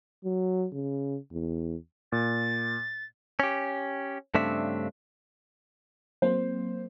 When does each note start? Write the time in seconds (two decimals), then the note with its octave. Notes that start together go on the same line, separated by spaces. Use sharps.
0.25 F#3
0.73 C#3
1.32 E2
2.12 A#2 A6
3.40 C#4 G4
4.35 G2 C#3 A3 C4 D4 E5
6.22 F#3 A#3 C4 C5